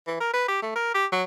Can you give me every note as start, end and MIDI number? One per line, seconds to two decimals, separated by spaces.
0.07 0.17 52
0.20 0.33 70
0.34 0.46 71
0.48 0.62 67
0.62 0.73 57
0.76 0.94 70
0.95 1.06 67
1.12 1.24 54